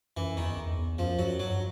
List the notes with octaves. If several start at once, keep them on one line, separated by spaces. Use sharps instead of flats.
F#2 E3
E2 D#3
E2
E2
F#2 F3
F#2 F#3
G2 F#3